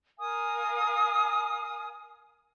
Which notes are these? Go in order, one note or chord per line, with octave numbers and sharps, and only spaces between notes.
A#4 F5 G#5 D#6